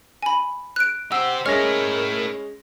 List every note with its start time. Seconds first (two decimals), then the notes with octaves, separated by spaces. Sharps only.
0.22 G#5 B5
0.76 F#6 D7
1.12 G4 C5 F#5 E6
1.46 G#3 C#4 E4 A#4 C#5 F6 A#6